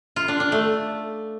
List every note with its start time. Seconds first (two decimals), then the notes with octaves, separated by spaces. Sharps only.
0.16 F4
0.28 D4
0.40 D4
0.52 A3